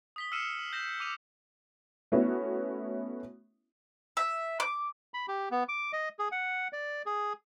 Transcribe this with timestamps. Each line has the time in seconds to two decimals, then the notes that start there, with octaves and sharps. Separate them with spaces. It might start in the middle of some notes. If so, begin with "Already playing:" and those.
0.16 D#6 B6 G7
0.32 E6 F6 C7 C#7 D#7 E7
0.55 D#7 F#7
0.73 G6 A#6 E7
1.00 D6 D#7 F7
2.12 A3 B3 C#4 E4 F#4
4.17 E5
4.60 D6
5.14 B5
5.28 G4
5.51 B3
5.69 D6
5.93 D#5
6.19 G#4
6.32 F#5
6.73 D5
7.06 G#4